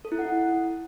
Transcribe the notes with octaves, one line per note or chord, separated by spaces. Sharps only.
A4
E4
F#5